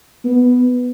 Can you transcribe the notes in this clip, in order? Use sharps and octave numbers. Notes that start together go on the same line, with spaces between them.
B3